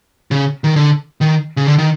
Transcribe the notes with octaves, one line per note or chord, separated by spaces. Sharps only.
C#3
D#3
D3
D#3
C#3
D3
D#3